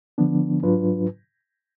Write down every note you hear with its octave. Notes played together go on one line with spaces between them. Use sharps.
D3 F3 B3 D4
G#2 F#3 D4 F4 B4